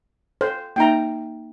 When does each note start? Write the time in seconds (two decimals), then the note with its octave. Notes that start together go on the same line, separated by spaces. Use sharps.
0.41 A4 C5
0.76 A#3 D#4 E5 G5 A#5